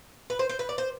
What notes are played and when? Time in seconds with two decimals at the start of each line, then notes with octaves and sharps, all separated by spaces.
0.30 B4
0.39 C5
0.49 C5
0.59 B4
0.69 D5
0.78 C5